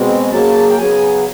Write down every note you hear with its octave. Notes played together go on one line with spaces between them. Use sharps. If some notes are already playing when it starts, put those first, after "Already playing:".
Already playing: B2 G#3 C4
C#3 F#3 A#3 A5
G5
C#3 F#3 B3 G#5